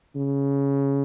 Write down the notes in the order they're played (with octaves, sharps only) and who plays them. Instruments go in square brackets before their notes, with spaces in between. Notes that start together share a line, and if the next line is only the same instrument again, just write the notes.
[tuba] C#3